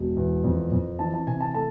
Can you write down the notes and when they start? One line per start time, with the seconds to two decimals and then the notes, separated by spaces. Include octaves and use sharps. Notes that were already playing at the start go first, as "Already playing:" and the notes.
Already playing: E1
0.17 E2
0.44 F2
0.72 F2
0.99 E3 A5
1.14 A5
1.27 C3 G#5
1.41 A5
1.54 A3 A5